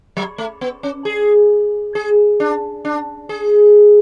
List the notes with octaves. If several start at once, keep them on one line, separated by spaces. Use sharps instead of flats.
F#3
A3
B3
C#4
G#4
G#4
D4
D4
G#4